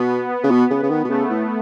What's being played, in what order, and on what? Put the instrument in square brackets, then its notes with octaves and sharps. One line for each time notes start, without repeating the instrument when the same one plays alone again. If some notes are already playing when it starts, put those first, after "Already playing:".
Already playing: [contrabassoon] B2 [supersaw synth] B3
[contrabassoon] C#3
[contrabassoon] B2 [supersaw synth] B3
[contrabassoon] C#3
C#3
D#3
B2
[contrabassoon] C#3 [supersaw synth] A3
[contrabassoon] A2